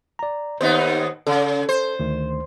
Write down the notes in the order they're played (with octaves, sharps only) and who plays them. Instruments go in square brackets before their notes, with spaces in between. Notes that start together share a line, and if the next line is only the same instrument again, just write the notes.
[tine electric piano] D5 A#5
[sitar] D#2 B3 D#4 [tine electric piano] C5
[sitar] C#3 [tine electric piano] A4
[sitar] C5
[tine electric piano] D2 D#3